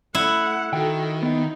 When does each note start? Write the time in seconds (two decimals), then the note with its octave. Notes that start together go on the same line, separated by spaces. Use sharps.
0.15 A3 E4 F#5
0.73 D#3 F#4 A4 G5
1.23 B3 D#4